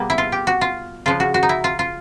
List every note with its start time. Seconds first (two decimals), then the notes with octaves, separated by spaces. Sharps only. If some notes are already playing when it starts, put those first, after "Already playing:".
Already playing: B2 G3 A#3 B3
0.10 E4
0.18 F4
0.32 G4
0.47 F#4
0.61 F4
1.06 C#3 F3 G#3 F4
1.20 F#4
1.34 F#4
1.43 D#4
1.49 E4
1.64 F4
1.79 F4